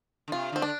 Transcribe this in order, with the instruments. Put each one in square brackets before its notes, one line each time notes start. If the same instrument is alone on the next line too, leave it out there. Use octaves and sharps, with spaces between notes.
[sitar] D3
[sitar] C3 [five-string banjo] F4
[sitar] D3 [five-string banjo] C4
[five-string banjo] D4